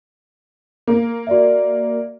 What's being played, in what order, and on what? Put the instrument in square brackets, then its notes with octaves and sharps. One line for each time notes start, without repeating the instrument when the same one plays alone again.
[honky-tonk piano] A#3
[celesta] F#4 D5 E5